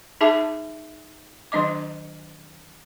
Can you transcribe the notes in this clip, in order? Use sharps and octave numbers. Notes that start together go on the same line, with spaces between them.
D#4 G#4 E5 A5 D6
D#3 F#3 D4 D#5 D6